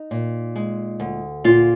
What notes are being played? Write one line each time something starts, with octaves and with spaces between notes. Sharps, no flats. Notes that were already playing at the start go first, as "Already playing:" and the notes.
Already playing: D#4
A#2
G#3
D2
A#2 F4